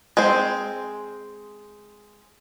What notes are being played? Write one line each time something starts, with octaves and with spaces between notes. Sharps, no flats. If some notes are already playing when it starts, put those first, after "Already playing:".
G#3 C4 C5